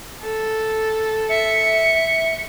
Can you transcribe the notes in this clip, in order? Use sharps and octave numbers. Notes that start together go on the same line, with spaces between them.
A4
E5 C#7